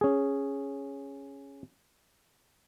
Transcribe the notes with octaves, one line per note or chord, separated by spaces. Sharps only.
C#4 G#4